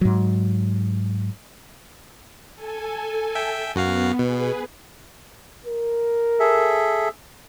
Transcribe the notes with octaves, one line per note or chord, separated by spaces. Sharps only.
G#2 F#3
A4 G#5
E5 G5
F#2 B3 F#4 F5
B2 G#4 B4
A#4
G#4 A4 E5